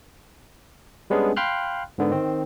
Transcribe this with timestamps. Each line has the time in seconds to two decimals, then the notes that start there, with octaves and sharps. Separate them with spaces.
1.10 G3 G#3 B3 C#4 D4 G#4
1.37 F5 G5 B5 C6 F6 F#6
1.98 G#2 D3 B3
2.11 D#3 C4